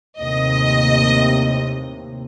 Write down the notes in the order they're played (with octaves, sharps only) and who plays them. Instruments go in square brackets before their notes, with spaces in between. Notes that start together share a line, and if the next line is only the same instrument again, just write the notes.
[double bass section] D#2 A2 C3 [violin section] D#5